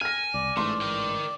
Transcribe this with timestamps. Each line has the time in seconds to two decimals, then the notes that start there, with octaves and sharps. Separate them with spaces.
0.01 G#5 F6 A#6
0.34 C2 D5
0.57 A1 G#2 E3 A3 C6
0.81 A#4 G5